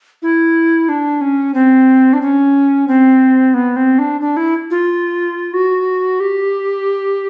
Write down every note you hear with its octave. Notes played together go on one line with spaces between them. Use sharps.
E4
D4
C#4
C4
D4
C#4
C4
B3
C4
D4
D4
E4
F4
F#4
G4